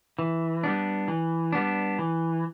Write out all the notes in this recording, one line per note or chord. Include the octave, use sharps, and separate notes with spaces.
E3
G3 B3 D4
E3
G3 B3 D4
E3